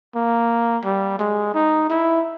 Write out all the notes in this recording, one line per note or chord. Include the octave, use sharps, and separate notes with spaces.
A#3
G3
G#3
D#4
E4